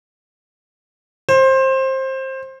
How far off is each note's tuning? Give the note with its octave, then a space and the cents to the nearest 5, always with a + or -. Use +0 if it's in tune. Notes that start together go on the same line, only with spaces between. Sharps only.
C5 +20